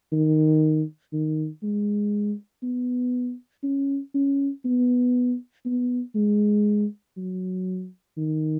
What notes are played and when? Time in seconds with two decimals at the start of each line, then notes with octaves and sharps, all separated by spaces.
0.12 D#3
1.13 D#3
1.63 G#3
2.63 B3
3.63 C#4
4.14 C#4
4.65 B3
5.65 B3
6.15 G#3
7.17 F#3
8.17 D#3